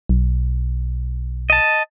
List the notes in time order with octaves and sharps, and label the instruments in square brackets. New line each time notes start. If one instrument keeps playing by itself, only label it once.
[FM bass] B1
[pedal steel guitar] D#5 A5